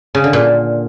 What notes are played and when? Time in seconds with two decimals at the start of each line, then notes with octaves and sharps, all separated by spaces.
0.15 C#3
0.24 D3
0.33 A#2